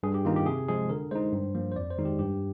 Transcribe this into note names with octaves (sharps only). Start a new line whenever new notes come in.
G2 G#4
G4
D#3 A#3 D#4 F4
G4
C3 G#4
F3 G#3 G#4
D3 A#4
G#3 D#4 C5
G2
F3 A#3
C5
F2 D5
C5
D#3 G#3 D#4
G4
G2 G4